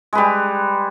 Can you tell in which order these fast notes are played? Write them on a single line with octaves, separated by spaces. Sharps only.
G#3 B4 G3